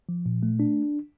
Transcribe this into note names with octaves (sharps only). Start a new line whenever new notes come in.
F3
A#2
A3
D4